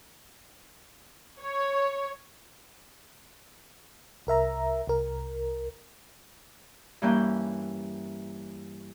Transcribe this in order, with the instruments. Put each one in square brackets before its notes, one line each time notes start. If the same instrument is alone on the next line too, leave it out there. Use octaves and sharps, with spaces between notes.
[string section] C#5
[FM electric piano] C2 A#4 E5 A#5
C2 A#4
[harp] G2 E3 A#3 C#4 G5 G6